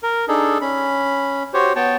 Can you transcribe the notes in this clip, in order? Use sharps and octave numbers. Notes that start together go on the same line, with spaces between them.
A#4
D4 D#4 G#4 A4
C#4 B5
F#4 G4 C5 C#5
B3 C#5 G5 A5